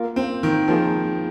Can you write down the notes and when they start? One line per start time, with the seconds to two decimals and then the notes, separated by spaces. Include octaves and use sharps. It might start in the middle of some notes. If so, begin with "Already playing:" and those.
Already playing: A#3 F4 A#4 F5
0.16 C4
0.43 D#3
0.68 D#3 F3 A#3 F4 G#4